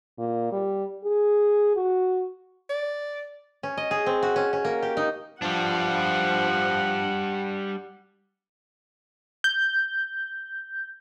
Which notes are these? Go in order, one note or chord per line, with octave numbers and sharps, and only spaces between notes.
A#2
G3
G#4
F#4
D5
C#4
D#5
G#4
C4
F#4
C#4
C#4
A#3
G4
D#4
F3 G3 D4 F#5
G6